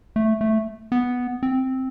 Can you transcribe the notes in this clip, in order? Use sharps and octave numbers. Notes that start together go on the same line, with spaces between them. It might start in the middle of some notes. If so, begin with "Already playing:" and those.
A3
A3
B3
C4